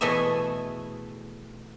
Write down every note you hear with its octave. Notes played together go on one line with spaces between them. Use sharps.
B2 E3 A3 G#4 E5